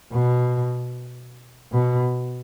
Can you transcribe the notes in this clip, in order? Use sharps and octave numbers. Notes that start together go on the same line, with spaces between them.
B2
B2